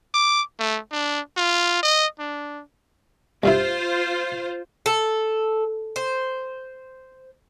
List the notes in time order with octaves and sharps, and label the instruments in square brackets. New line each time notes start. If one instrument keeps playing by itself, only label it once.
[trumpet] D6
A3
D4
F4
D#5
D4
[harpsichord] C2 G2 E4 [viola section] F4 C5
[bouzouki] A4
C5